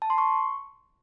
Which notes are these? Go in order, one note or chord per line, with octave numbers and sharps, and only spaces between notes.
A5
C6
C#6